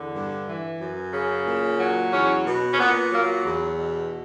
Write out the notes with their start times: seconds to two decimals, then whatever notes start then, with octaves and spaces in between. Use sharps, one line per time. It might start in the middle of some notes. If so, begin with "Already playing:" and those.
Already playing: E2 D3
0.15 G2
0.48 E3
0.81 F#2
1.14 C#3
1.47 A#2
1.80 F#3
2.13 E2 C#4
2.46 B2
2.73 C#4
2.79 A#2 B3
3.12 F#3 A#3
3.45 E2
3.78 B2